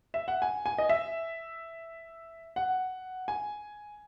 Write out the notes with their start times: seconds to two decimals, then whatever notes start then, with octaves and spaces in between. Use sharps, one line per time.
0.14 E5
0.28 F#5
0.42 G#5
0.66 G#5
0.78 D#5
0.89 E5
2.56 F#5
3.28 G#5